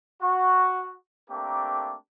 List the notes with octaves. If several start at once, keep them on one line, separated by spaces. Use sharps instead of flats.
F#4
A3 A#3 C4 D4 G4 A#4